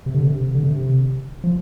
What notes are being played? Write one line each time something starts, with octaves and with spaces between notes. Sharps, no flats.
C3
D3
C3
D3
C3
F3